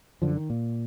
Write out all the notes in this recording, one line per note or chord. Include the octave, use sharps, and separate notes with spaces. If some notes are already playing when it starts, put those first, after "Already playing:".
F#2 D3 F3
D#3
A#2